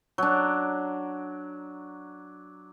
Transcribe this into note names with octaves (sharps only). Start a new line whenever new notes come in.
F#3 D4